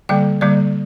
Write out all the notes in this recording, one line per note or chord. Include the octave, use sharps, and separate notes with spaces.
D3 G3 A#3 G5
D3 G3 A#3 D5